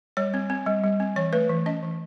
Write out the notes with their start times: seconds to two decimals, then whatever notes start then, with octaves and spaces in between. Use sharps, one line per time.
0.17 G3 C#5
0.34 C4
0.50 C4
0.66 G3
0.84 G3
1.00 C4
1.16 E3 C#5
1.33 A3 B4
1.49 E3
1.66 C#4 D#5
1.82 E3